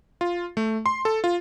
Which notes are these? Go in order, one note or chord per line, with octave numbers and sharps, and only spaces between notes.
F4
A3
C6
A4
F4